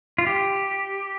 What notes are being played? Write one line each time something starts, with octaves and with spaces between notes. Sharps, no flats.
F4
G4